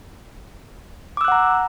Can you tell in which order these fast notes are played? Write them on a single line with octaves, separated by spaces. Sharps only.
D6 E6 F#6 F#5 A#5